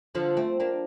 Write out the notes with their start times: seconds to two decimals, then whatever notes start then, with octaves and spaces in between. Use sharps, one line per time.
0.15 D3 F3
0.37 A3 C4
0.60 A#3 D4